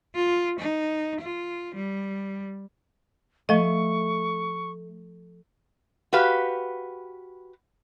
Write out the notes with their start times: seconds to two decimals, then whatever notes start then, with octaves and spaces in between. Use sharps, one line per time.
0.15 F4
0.59 D#4
1.20 F4
1.75 G3
3.49 F3 A3 D#5 C#6
6.13 F#4 G4 B4 F5